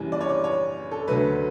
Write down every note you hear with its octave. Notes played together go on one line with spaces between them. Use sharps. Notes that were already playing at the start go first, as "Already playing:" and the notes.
Already playing: F#1 F#2 E3 G3
D5
C#5
D5
C#5
A4
D2 D3 F#3 A3 B4